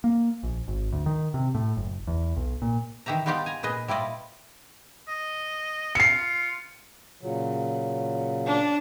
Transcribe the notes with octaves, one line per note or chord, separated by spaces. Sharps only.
A#3
A#1
G#1
D2
D#3
C3
A2
F#1
E2
B1
A#2
D#3 E3 G4 E5 A#5
G3 B3 D#4 F4 G4 D5
G#5 A#5
A#2 G#4 B4 D#5
G3 E4 F4 D5 D#5
D#5
F4 C7 C#7
A#2 C#3 F#3
D4